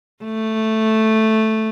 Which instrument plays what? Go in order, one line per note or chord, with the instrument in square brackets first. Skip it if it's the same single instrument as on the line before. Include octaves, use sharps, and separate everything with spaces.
[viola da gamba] A3